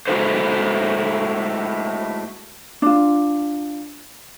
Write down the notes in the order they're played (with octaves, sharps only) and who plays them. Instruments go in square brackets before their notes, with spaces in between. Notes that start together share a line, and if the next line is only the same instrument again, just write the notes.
[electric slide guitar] G#3 A3 E4 F#4 A4 C5
[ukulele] D4 F4